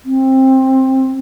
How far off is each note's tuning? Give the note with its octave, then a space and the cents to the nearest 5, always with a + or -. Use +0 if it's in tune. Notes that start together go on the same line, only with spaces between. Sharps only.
C4 +15